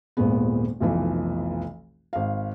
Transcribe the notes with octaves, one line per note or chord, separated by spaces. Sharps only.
D#1 G#1 A#2 G#3 B3
F1 B1 E3 F3
G#1 F5